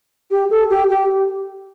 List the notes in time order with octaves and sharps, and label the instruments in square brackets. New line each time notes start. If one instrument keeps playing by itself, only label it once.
[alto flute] G4
A4
G4
G4